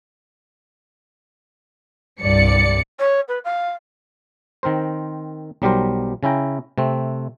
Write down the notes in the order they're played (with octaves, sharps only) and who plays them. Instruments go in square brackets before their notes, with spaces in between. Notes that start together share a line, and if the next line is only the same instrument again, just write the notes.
[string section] C2 D5 C#7 [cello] G2
[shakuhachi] C#5
B4
F5
[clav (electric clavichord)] D#3 C4 A#4 C5
B1 F#3 G3 G4 A#4 C5
C#3 C#4 E4 G5 A#5
C3 A3 C4